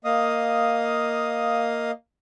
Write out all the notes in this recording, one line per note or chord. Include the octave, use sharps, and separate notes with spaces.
A#3 D#5 F5 D#6